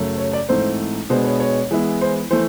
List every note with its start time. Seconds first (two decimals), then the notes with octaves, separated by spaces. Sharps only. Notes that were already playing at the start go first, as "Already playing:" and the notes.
Already playing: F#2 C#3 F#3 A3
0.18 C#5
0.33 D5
0.49 G#2 E3 A3 C4 D#4 C5
1.10 B2 G#3 B3 D4 C5
1.25 C#5
1.40 C#5
1.71 E3 G#3 B3 E4
2.01 C5
2.31 E3 A3 C5